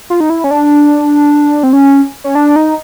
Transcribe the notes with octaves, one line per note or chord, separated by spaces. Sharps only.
F4
D#4
E4
C#4
D4
C4
C#4
C#4
D4
D#4